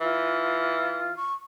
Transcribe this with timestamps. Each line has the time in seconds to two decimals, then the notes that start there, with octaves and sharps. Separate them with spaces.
0.01 E3 F4
1.16 C#6